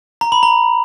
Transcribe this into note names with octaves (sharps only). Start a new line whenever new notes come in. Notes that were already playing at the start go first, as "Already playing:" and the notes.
A#5
B5
A#5